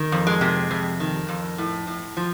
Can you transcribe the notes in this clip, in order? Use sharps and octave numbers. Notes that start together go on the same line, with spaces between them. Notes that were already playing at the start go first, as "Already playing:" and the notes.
Already playing: D#3
F2
G#3
C3
F2
D#3
F2
A2
A2
F3